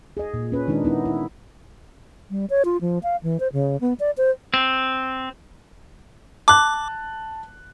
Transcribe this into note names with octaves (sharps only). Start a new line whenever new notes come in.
G#4 D#5
A#2
C#4 B4
D#3 G#3 D4 D#4
B3 D#4 E4
E4
G3
C#5
F4
F3
F5
E3
C5
C#3
B3
D5
C5
C4
A5 D6 F#6